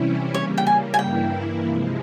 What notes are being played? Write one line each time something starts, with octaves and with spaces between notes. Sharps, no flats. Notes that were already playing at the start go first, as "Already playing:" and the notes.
Already playing: C3 E3 G3 C#4 E4
C#3 G3 A#3 C#5
G5
G#5
G#5
G2 E3 A#3 E4 G5
C3 F3 G#3